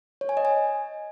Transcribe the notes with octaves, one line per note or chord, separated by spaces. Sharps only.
C#5
G#5
D#5
G#5